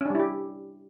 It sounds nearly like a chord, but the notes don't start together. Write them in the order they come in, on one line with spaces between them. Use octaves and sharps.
C#4 D4 G3 E4 G4